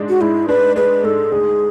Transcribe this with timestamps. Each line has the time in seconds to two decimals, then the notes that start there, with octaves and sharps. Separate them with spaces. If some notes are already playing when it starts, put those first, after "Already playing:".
Already playing: G#2 G#3 D4
0.09 F#4
0.21 G#2 E4
0.48 D4 B4
0.76 G#3 B4
1.03 G#2 A4
1.32 D2 G#4